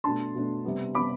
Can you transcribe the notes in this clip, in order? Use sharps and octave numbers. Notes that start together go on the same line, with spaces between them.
B2 A3 D4 A5 C6
B2 A3 D4
C3 G3 B3
C3 G3 B3 B5 D6